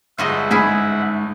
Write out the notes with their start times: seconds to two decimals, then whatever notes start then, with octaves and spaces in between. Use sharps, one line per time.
0.18 G1 G2 G#3 F4 F#4 D#5 E5 F#5
0.51 G#2 C#4 E4 G#4